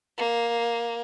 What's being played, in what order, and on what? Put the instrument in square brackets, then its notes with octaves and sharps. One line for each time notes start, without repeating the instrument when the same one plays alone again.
[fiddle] A#3